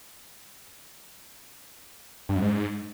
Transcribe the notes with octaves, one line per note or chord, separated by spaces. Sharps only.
G2
F#2
G#2